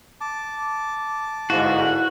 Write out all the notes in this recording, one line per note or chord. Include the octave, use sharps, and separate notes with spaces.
A5 D6
G1 G#2 E4 F#4 F5